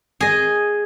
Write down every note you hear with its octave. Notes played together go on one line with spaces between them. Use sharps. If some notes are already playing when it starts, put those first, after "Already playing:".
G#4 D#5